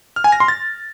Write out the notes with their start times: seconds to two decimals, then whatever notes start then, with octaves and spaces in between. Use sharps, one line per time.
0.16 F6
0.24 G#5
0.32 A#6
0.40 C6
0.48 A6